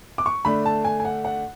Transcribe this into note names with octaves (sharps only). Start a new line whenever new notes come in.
D6
C#6
D3 A3 D4 B5
A5
G#5
G#5
F#5
F#5